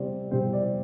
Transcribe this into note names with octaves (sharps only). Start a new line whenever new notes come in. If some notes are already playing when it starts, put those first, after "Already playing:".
Already playing: C3 G3 C4 D5
C3 G3 C4 C5
D5